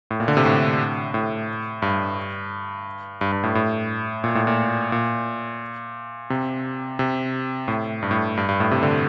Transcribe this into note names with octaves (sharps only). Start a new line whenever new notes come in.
A2
A#2
D3
C3
A2
A2
G2
G2
G2
A2
A2
A#2
A2
A#2
A#2
C3
C3
A2
G2
A2
G2
G2
A2
C3
D3